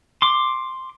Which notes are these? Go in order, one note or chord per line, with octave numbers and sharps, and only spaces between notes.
C6 D6